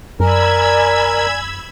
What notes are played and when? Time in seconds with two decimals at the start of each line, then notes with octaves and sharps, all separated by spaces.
0.20 F#2 A#4 D5 G#5 B5 E6 G#6